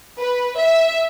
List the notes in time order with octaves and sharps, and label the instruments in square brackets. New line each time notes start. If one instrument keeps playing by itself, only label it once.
[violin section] B4
E5